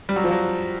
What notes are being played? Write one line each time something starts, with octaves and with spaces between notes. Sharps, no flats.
G3
F#3
F3
F#3